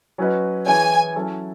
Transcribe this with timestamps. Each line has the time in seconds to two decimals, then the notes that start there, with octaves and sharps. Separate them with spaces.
0.18 F#3 C#4 F#4 B4 D#5
0.66 E3 B3 E4 G#4 C#5 G#5
1.15 F#3 C#4 E4 A4